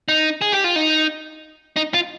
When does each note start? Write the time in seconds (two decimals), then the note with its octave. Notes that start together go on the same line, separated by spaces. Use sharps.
0.08 D#4
0.41 G#4
0.52 G4
0.64 F4
0.76 D#4
1.76 D#4
1.94 F4